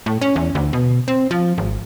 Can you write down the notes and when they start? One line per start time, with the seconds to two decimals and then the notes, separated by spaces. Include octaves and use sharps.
0.06 A2
0.21 C#4
0.36 E2
0.55 D2
0.73 B2
1.08 C4
1.31 F3
1.58 G#1